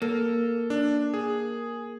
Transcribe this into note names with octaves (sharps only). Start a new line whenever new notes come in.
A#3 A4
D4
G#4